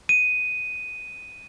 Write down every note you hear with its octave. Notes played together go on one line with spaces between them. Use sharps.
D#7